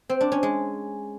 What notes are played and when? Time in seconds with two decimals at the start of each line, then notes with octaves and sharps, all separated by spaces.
0.09 C4
0.21 D4
0.32 C#4
0.43 G#3